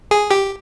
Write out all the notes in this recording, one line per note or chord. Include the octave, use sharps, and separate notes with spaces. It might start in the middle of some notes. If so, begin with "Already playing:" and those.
G#4
G4